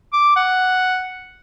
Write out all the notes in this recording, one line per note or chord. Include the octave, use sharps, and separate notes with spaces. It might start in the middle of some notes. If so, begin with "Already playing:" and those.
D6
F#5